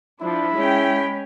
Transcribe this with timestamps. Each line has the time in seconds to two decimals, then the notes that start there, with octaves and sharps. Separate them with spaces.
0.21 F3 D4 E4 B5
0.56 G#3 C#4 G5